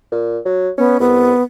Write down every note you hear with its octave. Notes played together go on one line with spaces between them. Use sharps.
A#2
F#3
B3 C#4
C2 B3